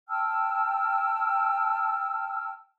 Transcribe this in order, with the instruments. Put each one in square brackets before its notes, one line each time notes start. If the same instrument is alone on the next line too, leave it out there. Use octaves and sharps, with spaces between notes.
[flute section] G5 A5 E6 F6